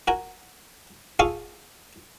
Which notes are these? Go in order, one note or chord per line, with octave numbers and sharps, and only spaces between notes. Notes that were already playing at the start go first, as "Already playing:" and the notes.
F#4 A#4 G#5
F4 G#4 A4 F5 C#6 D#6